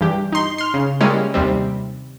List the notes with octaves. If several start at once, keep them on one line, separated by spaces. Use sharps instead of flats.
G2 E3 G4
D#4 C6
C6 F6
C#3
G3 G#3 A#3 C#4 E4
D#2 C3 G3 C4